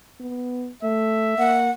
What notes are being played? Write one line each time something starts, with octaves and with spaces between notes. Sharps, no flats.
B3
A3 E5
A#3 F#5